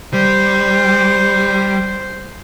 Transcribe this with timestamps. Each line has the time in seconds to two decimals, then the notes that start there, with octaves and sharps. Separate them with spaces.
0.13 G3 C5